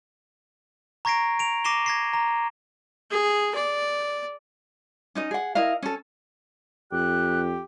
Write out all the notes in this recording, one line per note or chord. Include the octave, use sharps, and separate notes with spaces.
A#5 C#6 G#6 A#6 C7 D7
D7 F7
D6 A#6 C7 D#7 E7 G7
G#6 A#6 C7
A#5
G#4
D5
C#4 D#4 D#5
G#4 F#5
E4 A#4 D#5 F5
C#4 A4
F2 G4 F#6